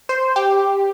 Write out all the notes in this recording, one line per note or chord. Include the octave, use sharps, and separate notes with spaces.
C5
G4